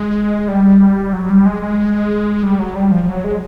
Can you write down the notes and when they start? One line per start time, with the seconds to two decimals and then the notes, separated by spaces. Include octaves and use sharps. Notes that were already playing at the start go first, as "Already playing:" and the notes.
Already playing: G#3
0.48 G3
1.13 F#3
1.30 G3
1.46 G#3
1.62 G#3
2.43 G3
2.59 F#3
2.76 G3
2.91 F3
3.03 F3
3.08 F#3
3.24 G#3